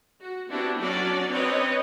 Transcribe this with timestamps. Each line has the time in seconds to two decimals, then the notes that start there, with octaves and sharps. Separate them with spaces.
0.20 F#4
0.50 B3 C4 D4 E4 F#4 G4
0.79 F#3 C#4 D4 F#4 D5
1.30 C4 B4 C#5 D#5